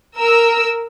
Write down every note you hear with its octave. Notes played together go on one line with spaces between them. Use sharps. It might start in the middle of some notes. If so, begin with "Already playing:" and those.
A#4 E6